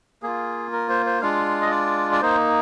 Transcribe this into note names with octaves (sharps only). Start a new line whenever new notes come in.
A#3 F4 G#4
A#4
C5
C5
G#3 D4 F4 F5
D#5
D5
D5
A#3 D#4 C5